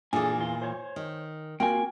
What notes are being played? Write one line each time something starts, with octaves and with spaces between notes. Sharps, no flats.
A#2 E3 D4 G#4 A4 G#5
E2 F4
C5 C#5
D#3
A#3 C4 F4 F#4 G5 G#5